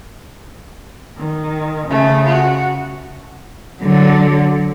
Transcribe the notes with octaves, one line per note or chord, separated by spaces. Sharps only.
D#3
C#3 A3
F#4
D3 F#3